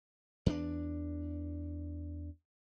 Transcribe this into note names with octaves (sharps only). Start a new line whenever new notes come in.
E2 C#4 D4